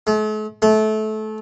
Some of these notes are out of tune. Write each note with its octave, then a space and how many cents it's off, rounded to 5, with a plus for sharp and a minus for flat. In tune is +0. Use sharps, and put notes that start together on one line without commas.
A3 -45
A3 -25